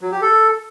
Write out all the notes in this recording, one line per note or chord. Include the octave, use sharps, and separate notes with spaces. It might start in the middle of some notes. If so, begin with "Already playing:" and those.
F#3
G4
A4